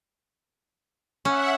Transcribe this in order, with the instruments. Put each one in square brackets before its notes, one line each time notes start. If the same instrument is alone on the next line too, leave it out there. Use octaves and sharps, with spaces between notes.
[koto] C#4 [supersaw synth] E5 F#5